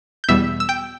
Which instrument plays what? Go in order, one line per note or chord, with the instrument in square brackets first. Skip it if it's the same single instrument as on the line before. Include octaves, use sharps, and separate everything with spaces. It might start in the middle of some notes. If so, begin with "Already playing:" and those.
[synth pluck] G6
E2 B2 G3 E5 E6
E6
G5 G6